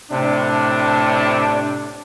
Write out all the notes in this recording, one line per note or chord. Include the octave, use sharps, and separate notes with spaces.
A2 C3 D4